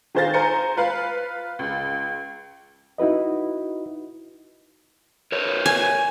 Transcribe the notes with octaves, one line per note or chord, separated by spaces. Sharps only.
D#3 G#4 C5 F5 A6 A#6
C5 G#5 A#5 C#7
F4 B4 F5
C#2
D#4 E4 F#4 B4 D#5
A#4 B4 C#5
G#5